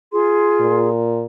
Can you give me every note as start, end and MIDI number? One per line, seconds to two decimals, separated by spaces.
0.12 0.89 65
0.12 0.89 68
0.12 0.89 84
0.60 1.26 46